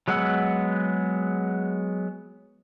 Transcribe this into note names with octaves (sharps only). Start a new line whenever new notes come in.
F#3 G#3 B3 F#5 E6